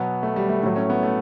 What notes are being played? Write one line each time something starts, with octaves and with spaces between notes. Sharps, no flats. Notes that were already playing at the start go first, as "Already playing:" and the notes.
Already playing: B2 F#3 B3
A3
G3
A3
A2 F#3 A3
C#4
B3
A3